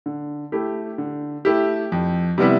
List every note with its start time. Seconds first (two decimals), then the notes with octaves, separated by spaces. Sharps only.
0.06 D3
0.52 A3 E4 G4
0.98 D3
1.45 A3 E4 G4
1.92 F2
2.38 C3 G3 B3 E4